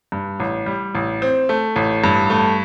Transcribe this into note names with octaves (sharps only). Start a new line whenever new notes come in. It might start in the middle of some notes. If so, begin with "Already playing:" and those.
G2
A1
G3
A1
C4
A3
A1
G2
A3